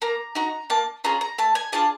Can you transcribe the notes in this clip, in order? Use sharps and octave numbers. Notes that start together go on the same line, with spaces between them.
A#3 A#5
D#4 F#4 A#5
A#3 A5
C#4 F4 G#4 A#5
A#5
A3 A5
G#5
D4 F4 G#4 A5